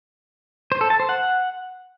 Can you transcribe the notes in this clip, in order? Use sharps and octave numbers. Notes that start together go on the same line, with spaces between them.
C5
A4
A5
C5
F#5